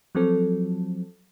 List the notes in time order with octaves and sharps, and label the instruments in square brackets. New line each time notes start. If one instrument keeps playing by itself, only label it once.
[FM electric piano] F3 F#3 C4 A4